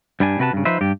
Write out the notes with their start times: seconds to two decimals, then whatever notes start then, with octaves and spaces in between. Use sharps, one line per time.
0.20 G2 G3 D4 G#5
0.39 C3 F#4 B4 G#5 A5
0.53 G2 C#3
0.65 F3 D#4 B4 C5 E5
0.81 G2 G4